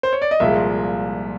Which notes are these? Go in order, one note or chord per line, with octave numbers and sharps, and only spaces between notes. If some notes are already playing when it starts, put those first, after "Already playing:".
C5
C#5
D5
D#5
C2 A#2 F3 G#3 E5